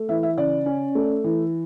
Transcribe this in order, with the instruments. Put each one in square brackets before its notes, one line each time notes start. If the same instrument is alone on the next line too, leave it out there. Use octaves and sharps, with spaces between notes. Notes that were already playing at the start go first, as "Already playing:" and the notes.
Already playing: [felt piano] A3
E3 E5
E5
C#3 D5
C#4
A3
E3